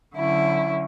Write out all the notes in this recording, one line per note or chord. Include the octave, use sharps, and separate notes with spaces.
D3 F#3 C#4 E4